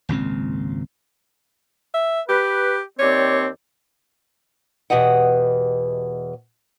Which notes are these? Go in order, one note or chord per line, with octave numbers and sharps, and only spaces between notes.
G#1 C#2 A#2 C4
E5
G4 B4
D#2 C4 C#5 D5
E2 B2 G4 D#5 F#5